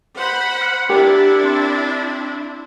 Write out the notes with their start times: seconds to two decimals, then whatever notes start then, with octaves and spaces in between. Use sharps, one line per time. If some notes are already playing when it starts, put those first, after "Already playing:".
0.17 C5 F#5 B5
0.61 F6 F#6 C#7
0.90 D4 E4 G4 A#4 G5
1.43 C4 C6